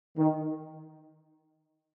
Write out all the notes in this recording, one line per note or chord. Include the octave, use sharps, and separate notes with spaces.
D#3